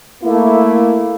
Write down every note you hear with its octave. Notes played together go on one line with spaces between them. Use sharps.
A3 A#3 E4